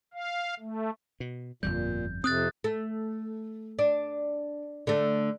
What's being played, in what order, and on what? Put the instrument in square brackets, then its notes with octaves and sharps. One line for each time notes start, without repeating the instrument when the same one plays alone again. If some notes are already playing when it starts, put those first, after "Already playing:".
[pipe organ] F5
A3
[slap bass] B2
[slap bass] G1 F2 G3 [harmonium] A#2 [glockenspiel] G6
[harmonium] F2 C3 [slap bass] C4 [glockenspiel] D#6 F#6 A6
[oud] A3
D4
D3 A3